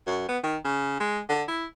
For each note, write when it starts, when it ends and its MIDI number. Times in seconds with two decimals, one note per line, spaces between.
0.07 0.24 42
0.28 0.38 59
0.44 0.57 51
0.65 0.99 49
1.00 1.20 56
1.29 1.43 50
1.48 1.65 64